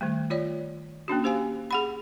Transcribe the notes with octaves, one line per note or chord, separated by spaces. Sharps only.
D#3 G3 A3
F4 C#5 D5
A#3 C#4 D4 F#4
G4 C5 F5 G#5
G#4 F#5 B5